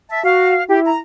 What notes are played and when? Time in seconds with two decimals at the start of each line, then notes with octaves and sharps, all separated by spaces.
0.09 E5 A5
0.24 F#4 F5
0.68 E4 G4
0.84 A#5